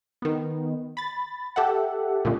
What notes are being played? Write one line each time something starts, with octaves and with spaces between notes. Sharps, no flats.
D#3 B3
B5 A6
G4 A4 E5 F#5
A#2 D3 G#3 A3 C#4